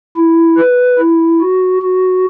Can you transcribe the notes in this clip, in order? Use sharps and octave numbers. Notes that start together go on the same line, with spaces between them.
E4
B4
E4
F#4
F#4